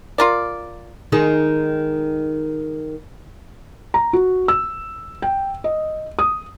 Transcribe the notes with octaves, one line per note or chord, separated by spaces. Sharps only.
F4 A#4 D5
D#3 G#3 D#4
A#5
F#4
E6
G5
D#5
D#6